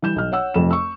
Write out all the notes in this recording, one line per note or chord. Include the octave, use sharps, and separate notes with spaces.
E3 G3 G6 E7
B1 F6
C#5 F#5 E6
F1 F2 E7
C#6 E6